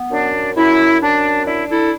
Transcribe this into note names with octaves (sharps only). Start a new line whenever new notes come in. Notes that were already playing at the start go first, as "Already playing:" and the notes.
Already playing: B3
F#2 D4
F#2 E4
F#2 D4
D4 E4
E4 A4